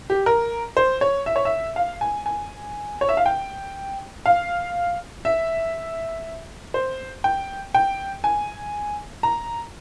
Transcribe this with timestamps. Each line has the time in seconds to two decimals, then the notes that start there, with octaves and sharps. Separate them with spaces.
0.10 G4
0.26 A#4
0.77 C5
1.01 C#5
1.26 E5
1.36 C#5
1.45 E5
1.76 F5
2.01 G#5
2.26 G#5
3.01 C#5
3.09 E5
3.17 F5
3.26 G5
4.26 F5
5.25 E5
6.74 C5
7.24 G5
7.74 G5
8.24 G#5
9.23 A#5